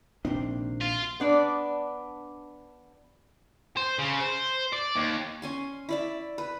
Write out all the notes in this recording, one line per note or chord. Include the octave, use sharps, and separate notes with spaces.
A#1 C3 D#3 A#3 C4 D4
F4
B3 D4 D5
C5
C#3
C5
D5
D#2
C#4 G#5 C6
E4 D5 E5
B4